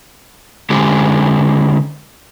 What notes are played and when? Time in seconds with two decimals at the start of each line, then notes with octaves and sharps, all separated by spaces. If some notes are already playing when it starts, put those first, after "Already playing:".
0.70 D3 G#3 C4 C#4 G4